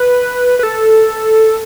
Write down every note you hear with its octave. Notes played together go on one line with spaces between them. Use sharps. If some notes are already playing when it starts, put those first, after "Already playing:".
Already playing: B4
B4
A4